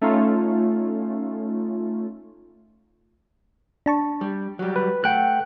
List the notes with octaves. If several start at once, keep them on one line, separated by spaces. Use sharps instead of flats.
A3 C#4 D#4 F4
D4 A5 C#6
G3
F#3 G3
B4
A3 F#5 G5 F#6